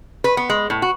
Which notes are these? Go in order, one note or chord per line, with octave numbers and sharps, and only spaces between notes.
B4
B3
G#3
A2
F#4